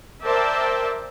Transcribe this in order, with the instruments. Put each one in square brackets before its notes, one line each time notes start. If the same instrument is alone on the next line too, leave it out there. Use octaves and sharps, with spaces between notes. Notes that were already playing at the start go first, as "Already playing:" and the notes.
[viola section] A#4 C5 D5 E5 G5 A5